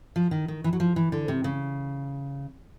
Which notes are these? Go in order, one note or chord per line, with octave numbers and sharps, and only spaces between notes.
F3
D#3
D#3
E3
F#3
F3
E3
D3
C3
C#3